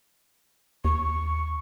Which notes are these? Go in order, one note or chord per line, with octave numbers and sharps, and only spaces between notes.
D#2 C#6